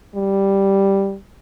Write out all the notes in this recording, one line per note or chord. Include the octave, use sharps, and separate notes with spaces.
G3